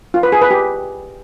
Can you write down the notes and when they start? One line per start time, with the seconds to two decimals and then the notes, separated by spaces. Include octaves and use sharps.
0.14 F4
0.23 B4
0.32 G#4
0.42 B4
0.51 G4